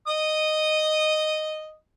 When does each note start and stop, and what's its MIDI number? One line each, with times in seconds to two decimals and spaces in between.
0.08 1.74 75
0.08 1.74 87